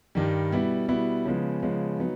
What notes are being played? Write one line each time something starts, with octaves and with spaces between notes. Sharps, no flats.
G2 D#3 G3
B2 G3 B3 E4
B2 G3 B3 E4
C#3 F3 G#3 B3
C#3 F3 G#3 B3
F#3 B3 D#4